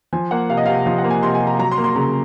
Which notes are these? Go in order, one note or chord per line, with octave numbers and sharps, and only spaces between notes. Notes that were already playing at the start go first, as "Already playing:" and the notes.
F3 G#5
A#3 F#5
C3 F5
D#5
C3 F5
F3 F5
F#5
A#3
G#5
C3 C6
G#5
C3
A#5
F#3 A#5
C6
A#3
C6
C#3 A#5